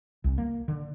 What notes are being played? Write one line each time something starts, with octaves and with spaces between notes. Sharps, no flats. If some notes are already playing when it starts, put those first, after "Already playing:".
C2
A#3
D3